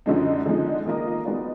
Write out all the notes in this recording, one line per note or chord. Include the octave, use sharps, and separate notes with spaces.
F#2 D3 F3 G#3 D#4
D3 F3 G#3 D#4
D#3 A#3 F4 A#4 D#5
G#3 B3 D#4 F#4 D5